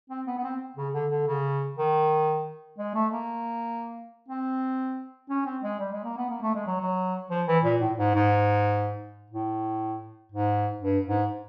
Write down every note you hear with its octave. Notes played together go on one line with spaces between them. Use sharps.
C4
B3
B3
C4
C#3
D3
D3
C#3
D#3
G#3
A3
A#3
C4
C#4
C4
G#3
G3
G#3
A#3
B3
A#3
A3
G#3
F#3
F#3
F3
E3
A#2
A2
G#2
G#2
A2
G#2
G2
G#2